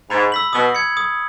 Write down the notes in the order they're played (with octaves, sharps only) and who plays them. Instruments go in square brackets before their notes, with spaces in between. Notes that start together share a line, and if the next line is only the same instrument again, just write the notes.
[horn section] G#2 [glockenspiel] B5
[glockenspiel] E6 B6 F#7
[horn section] B2 [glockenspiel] D#6
[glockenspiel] G#6 C#7
D#6